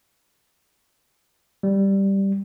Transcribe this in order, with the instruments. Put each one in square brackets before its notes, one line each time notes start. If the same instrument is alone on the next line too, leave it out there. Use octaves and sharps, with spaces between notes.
[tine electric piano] G3